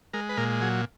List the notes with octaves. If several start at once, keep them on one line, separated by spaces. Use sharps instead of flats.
G#3 A#4
B4
A#2 A#4
F#3 G#4